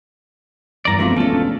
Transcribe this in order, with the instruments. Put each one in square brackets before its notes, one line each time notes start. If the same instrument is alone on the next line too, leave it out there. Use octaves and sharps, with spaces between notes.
[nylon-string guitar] E2 G2 E3 [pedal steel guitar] D5 A#5
[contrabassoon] E1 [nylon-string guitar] F3 C4 F4 [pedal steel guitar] A3 D4
[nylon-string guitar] D2 C#4 [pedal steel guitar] A3 F4 A4